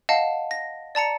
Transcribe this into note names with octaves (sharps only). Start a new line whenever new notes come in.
D#5 F5 F#5 A5
A#6
D5 A5 A#5 C#7